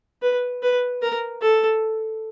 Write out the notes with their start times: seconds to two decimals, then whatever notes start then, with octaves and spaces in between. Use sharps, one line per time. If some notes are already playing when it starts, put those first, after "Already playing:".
0.22 B4
0.62 B4
1.02 A#4
1.41 A4